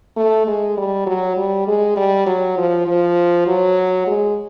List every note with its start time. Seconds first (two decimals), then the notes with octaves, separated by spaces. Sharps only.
0.17 A3
0.47 G#3
0.77 G3
1.06 F#3
1.37 G3
1.67 G#3
1.96 G3
2.26 F#3
2.58 F3
2.87 F3
3.47 F#3
4.07 G#3